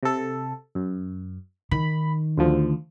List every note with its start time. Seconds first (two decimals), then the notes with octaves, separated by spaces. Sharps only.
0.03 C3 A4
0.75 F#2
1.71 D#3 B5
2.38 D2 F3